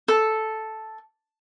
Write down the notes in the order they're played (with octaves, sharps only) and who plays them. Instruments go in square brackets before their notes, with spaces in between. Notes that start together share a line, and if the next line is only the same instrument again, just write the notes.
[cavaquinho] A4